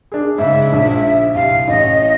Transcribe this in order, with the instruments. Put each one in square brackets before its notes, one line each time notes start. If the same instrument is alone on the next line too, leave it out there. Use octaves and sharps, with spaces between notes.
[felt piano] D4 G#4
[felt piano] G#2 C#3 [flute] E5
[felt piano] A#1
[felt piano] C2 [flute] F5
[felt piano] A1 [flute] D#5